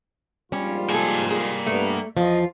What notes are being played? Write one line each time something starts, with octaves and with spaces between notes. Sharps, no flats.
A#1 G#2 G3 C#4 F4
A#3 G#4 A4 G#5
G#4
G2 A3 B3
E2 F3 F4 D#5